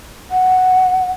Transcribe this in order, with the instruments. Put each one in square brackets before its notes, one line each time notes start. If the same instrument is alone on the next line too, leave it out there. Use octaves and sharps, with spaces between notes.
[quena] F#5